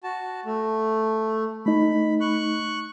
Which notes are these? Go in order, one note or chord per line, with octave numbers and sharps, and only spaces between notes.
F#4 A5
A3
A3 D#4 B5
C#6 F#6